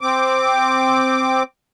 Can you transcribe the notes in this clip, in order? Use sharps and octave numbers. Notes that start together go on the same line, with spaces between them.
C4 D6